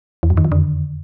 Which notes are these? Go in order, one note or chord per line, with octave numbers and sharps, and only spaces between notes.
E2
F#2
D#3
F2
D3